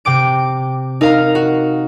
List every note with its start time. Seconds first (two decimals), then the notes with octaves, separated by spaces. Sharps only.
0.05 C3 G5 D6 D7
1.01 D#4 A#4 F5 A#5
1.35 F#4